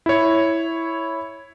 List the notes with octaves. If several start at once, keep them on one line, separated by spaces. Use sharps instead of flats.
E4 C#5